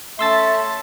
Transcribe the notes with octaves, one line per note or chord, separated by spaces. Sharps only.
A3 C#4 E5 A5 C6 E6 A6